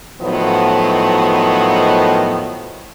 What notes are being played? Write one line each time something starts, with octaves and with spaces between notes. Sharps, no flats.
A2 D#3 F3 F#3 B3